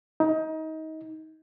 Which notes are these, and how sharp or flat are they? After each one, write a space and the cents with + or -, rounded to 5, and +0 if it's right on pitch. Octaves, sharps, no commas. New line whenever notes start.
D#4 +25